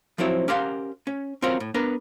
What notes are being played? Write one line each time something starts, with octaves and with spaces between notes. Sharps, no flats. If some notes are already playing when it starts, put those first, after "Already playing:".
F3 F#3 C4 E4 C#5
C#4 G4 A#4 C5 F5 F#5
C#4
C4 C#4 F4 F#4 A#4
A2
B3 D4 A#4 B4